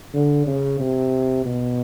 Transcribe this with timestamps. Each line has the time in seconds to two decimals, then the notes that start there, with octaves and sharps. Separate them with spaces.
0.14 D3
0.47 C#3
0.80 C3
1.45 B2